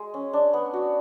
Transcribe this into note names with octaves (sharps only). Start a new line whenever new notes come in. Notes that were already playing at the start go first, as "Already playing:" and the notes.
Already playing: G#3
C#4
D4
B3
F#4